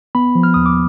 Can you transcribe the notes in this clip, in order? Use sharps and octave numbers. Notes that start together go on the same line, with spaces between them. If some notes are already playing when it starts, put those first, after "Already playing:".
B3 B5
F3
F6
D#2 D#6
D6